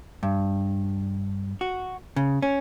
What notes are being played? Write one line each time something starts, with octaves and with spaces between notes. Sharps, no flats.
G2
F#4
C#3
C#4